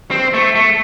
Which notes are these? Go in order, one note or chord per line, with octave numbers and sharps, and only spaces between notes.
C4
A3
A3